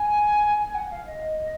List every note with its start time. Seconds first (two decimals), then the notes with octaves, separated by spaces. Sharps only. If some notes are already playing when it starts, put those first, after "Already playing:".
Already playing: G#5
0.58 G#5
0.75 F#5
0.91 F5
1.06 D#5